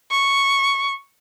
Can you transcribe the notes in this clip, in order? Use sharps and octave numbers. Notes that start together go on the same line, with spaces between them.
C#6